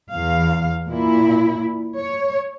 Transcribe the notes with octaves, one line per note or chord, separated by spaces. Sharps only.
E2 F5
A#2 E4
C#5